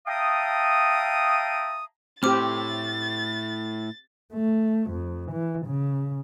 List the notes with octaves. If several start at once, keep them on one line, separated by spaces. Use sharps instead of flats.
E5 F5 G5 A5 A#5 D#6
A2 C4 G4 D6 F6 A6
A3
F2
E3
C#3